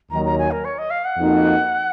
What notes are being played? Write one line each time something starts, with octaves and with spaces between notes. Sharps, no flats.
D#2 D#3 F#3 A#5
A#5
G#5
A#4
C#5
D#5
F5
F#5
F2 F3 A#3 D#4 F#4